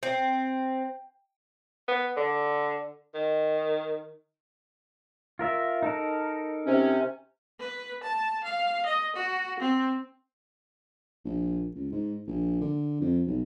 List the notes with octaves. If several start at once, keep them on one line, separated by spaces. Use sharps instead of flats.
C4
B3
D3
D#3
F4 A#4 E5
D#4 A4 A#4
C3 C#4
B4
A5
F5
D#5
F#4
C4
A#1
C#2
G#2
A#1
D3
F2
B1